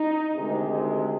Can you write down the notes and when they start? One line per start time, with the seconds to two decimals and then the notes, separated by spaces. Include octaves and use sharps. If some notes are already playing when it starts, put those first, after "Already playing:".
Already playing: D#4
0.34 D2 C3 D#3 G#3